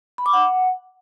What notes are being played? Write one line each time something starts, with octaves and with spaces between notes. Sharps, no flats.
B5
D6
F#5